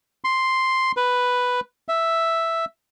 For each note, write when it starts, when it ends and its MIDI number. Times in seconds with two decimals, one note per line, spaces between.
0.24 0.92 84
0.97 1.60 71
1.88 2.65 76